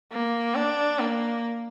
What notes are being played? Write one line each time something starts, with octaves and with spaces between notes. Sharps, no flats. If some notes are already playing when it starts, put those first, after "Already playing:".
A#3
D4
A#3